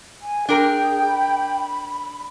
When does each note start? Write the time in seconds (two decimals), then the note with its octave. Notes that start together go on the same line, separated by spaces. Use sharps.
0.22 G#5
0.49 D4 G#4 A#4 G5
1.06 B5